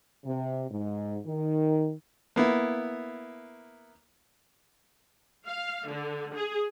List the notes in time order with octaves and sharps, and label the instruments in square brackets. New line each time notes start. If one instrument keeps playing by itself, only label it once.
[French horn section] C3
G#2
D#3
[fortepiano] A#3 B3 E4
[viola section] F5
D3
G#4